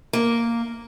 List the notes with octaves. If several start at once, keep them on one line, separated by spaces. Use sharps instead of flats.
A#3